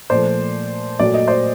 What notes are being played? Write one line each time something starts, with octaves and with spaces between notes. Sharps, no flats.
A#2 F3 A3 C5 D5
A#2 F#3 A3 D5
D#5
C5 D5